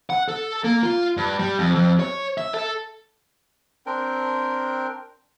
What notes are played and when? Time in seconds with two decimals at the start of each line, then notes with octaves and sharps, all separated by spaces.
0.10 F#5
0.28 A4
0.64 A#3
0.83 F4
1.17 G2
1.39 G3
1.59 F2
1.75 F2
2.00 C#5
2.38 E5
2.54 A4
3.86 C4 D4 A#4 G5